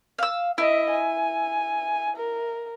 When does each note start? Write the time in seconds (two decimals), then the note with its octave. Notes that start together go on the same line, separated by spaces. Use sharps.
0.19 F5 E6
0.58 E4 D#5 E5
0.90 G#5
2.16 A#4